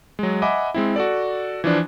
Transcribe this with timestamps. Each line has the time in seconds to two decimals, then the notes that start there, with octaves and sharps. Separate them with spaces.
0.19 F#3 G#3
0.42 D#5 E5 F#5 G#5 B5 D6
0.74 G#3 C4 E4
0.96 F#4 A4 D5
1.64 E3 F3 D4